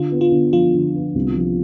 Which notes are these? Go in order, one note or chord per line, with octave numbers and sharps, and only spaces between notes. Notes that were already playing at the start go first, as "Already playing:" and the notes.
Already playing: D3 F4
B3
F4
D3
F3 F4
D3
B3
C2
F3